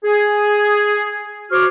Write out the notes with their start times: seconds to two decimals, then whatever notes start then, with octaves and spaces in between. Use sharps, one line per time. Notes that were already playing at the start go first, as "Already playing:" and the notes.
0.04 G#4
1.51 F#4 C5 C#5 D6 F6